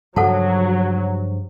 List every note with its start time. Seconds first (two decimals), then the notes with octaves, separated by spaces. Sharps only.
0.16 G2 C#3 F3 F#3 A4 F#5 A5